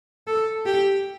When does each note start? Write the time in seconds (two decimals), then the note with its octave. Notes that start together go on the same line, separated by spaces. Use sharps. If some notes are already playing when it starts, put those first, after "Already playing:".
0.27 A4
0.66 G4